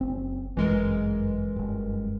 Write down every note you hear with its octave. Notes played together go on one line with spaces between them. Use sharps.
F#1 C4
G1 F#2 E3 G#3 A#4
F#1 G2